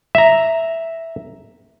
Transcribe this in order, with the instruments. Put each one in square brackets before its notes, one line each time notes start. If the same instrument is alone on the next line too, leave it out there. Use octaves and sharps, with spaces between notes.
[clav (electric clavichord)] E5 A#5